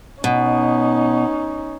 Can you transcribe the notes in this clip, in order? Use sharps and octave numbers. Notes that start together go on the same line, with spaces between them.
B2 C#4 D#4